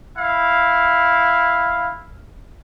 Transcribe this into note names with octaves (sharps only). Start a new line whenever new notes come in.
E4 F5